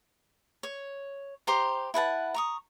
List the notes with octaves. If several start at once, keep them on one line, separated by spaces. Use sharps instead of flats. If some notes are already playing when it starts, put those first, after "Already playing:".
C#5
G4 C5 A#5 C6
E4 B4 F#5 A5
A#5 C#6 D#6